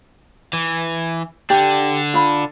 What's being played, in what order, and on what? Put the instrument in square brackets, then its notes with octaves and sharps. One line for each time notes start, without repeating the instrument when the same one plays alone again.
[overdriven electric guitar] E3
[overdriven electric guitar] D3 D4 [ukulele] G4
[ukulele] F4 B5